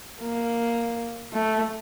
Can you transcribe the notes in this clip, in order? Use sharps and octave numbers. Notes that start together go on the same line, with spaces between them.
A#3
A3